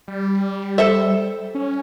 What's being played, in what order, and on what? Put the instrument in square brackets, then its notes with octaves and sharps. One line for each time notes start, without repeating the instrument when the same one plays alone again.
[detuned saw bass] G3
[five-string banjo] A4 C5 E5
[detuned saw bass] C#4